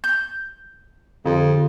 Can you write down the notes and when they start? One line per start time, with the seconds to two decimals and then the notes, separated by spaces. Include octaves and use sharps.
0.04 G6
1.26 F2 D3